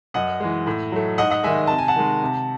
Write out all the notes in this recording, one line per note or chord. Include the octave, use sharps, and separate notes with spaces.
F#2 D#5 F#5
E3 G#3
A2
F#3 A3
G#2 D#5 F#5
D#5 F#5
D#3 G#3 E5 G#5
C3 A5
G#5
F#5 A5
D#3 G#3
C3